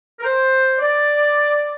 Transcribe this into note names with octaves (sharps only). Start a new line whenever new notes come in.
A#4
C5
D5